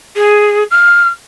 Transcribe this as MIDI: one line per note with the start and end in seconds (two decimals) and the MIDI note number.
0.16 0.64 68
0.71 1.08 89